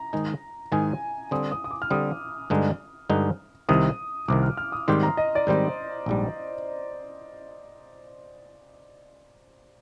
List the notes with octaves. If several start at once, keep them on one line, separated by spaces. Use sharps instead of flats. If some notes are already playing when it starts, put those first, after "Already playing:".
Already playing: A#5
G#2 D#3 G#3 D#4 G#4
G#2 D#3 G#3 D#4 G#4 G#5
D3 G3 C4 D#6
D#6
D#6
D6
F6
D3 G3 C4 D#6
G2 D3 G#3 D#4
G2 D3 G#3 D#4
C2 C3 D#3 D#6
C2 C3 D#3 D6
F6
F6
D#6
G#2 D#3 G3 C4 G4 C6
A#5
D#5
D5
G#2 D#3 G3 C4 G4 C5
A#1 G#2 G3